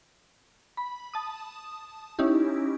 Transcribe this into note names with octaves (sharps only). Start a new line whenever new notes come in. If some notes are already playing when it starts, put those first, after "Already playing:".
B5
A5 D#6
C#4 D#4 E4 G4